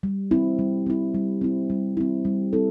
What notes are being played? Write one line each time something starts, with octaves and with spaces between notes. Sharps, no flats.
G3
C4 E4
G3
C4 E4
G3
C4 E4
G3
C4 E4
G3
C4 E4 A4